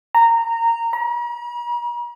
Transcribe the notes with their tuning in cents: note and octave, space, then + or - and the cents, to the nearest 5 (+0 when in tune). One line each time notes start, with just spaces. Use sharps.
A#5 -15
A#5 +45